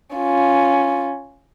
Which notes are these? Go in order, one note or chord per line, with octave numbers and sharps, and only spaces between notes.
C#4 F4